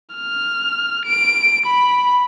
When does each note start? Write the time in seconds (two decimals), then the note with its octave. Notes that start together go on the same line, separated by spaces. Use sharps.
0.15 F6
1.06 D7
1.66 B5